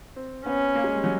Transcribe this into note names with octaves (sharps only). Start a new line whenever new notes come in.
C4
B3 C#4
A#3
G#3
G3
F#3